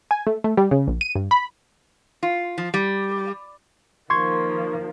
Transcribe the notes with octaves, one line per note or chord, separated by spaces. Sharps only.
G#5
A3
A3
G3
C#3
A#1
D#7
G2
B5
F4
F3
G3
D#3 F3 A#3 C6 C#6 G#6